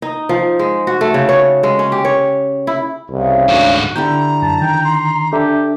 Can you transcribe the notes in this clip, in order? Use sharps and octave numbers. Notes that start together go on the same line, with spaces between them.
D#4
F3
G#3
F#4
A3
C#3
C#5
G#3
C#4
G4
C#5
E4
C2 C#3
D2 G#2 F#4
D3 E4 G4 A#5 G6
F#2 A5
D#3 G5
C6
D4 G4 A4 E5